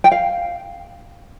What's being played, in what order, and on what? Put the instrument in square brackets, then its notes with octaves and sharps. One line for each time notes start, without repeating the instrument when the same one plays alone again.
[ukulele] G5
F5